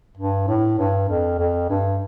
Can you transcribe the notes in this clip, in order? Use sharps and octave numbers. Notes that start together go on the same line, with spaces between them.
G2
A2
G2
F2
F2
G2